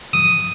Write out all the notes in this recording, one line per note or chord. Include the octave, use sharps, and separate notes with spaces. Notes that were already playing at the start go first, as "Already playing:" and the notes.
D#6